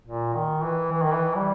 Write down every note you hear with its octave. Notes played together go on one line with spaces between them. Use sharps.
A#2
D#3
E3
E3
D#3
E3
G3